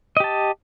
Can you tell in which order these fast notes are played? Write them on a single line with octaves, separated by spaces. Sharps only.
D#5 G4 A5